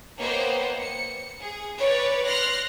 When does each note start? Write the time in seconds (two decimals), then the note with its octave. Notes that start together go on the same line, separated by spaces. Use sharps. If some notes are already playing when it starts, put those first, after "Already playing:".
0.20 A#3 B3 C5 C#5 D#5 G5
0.79 C#7
1.41 G#4
1.79 B4 C#5 D5
2.26 C6 F6 F#6 A#6